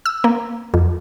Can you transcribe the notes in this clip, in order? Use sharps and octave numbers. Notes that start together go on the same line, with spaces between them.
E6
A#3
F2